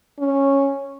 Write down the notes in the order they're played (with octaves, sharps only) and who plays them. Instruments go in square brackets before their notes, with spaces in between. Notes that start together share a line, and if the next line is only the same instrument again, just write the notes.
[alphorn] C#4